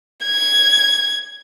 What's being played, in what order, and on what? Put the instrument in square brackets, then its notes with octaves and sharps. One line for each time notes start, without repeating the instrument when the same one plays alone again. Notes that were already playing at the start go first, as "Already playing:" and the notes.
[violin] G#6